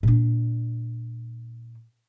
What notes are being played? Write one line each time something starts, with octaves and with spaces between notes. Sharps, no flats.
A#2 D4